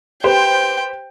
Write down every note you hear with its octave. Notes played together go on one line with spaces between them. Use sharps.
G4 B4 C5 G5